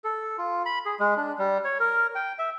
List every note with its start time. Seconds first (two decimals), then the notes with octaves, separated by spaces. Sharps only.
0.04 A4
0.38 F4
0.66 B5
0.86 G#4
1.00 G#3
1.17 D4
1.39 G3
1.65 C#5
1.80 A#4
2.15 G5
2.39 E5